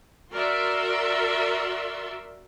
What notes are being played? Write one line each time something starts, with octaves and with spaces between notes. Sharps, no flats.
F#4 A#4 D5 E5 C6